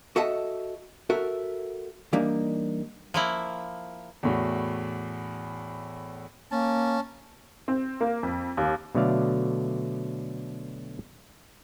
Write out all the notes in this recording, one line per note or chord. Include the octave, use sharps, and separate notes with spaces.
F#4 A4 D#5 E5 F#5 A5
F#4 A4 A#4 E5
E3 G3 A#3 D4 D#4
F3 A#3 E4
E2 A2 F#4
A#3 C#4 A5
C4
A#3
F2
D#2
B2 D3 F#3 A3 D5 F5